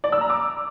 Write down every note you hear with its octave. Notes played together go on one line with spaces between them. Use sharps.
D5
E6
A#5
D6